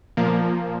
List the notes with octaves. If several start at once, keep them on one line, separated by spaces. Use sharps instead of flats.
A#2 F3 A#3